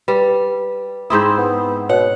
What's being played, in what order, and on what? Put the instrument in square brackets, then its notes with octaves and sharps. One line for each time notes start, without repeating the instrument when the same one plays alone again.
[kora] G3 [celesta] B4
[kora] G#2 C4 E4 [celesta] D#6 G6
[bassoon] B3
[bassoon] B2 [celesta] C#5 [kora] F#5